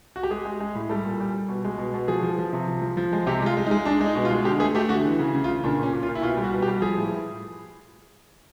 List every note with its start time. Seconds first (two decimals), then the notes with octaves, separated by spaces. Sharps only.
0.16 F#4
0.23 G4
0.30 G#3 G#4
0.45 G#3
0.60 G#3
0.75 A2
0.89 G3 A4
1.05 A#2
1.20 G3
1.34 G3
1.49 B2
1.65 G#3
1.78 B2
1.94 B2
2.08 F3 G#4
2.23 F3
2.39 F3
2.53 C3
2.68 F3
2.82 F3
2.97 F3
3.13 G#3
3.27 C3 G4
3.42 G#3 F4
3.57 G#3
3.67 D#4
3.71 G#3
3.85 G#3 D4
4.01 G#3
4.06 D#4
4.15 B2
4.25 F4
4.31 G#3
4.45 D3 G4
4.60 A3 G#4
4.75 A3 G4
4.89 D3 F#4
5.05 E3
5.19 C#3
5.35 C#3
5.44 F4
5.49 C#3
5.64 A#2 D4
5.79 A#2 C#4
5.93 A#2
6.03 F4
6.08 A#2
6.15 E4
6.22 B2 F4
6.37 G3
6.43 F#4
6.53 B2
6.62 G4
6.68 G3
6.82 F3 G#4
6.97 A2
7.11 A2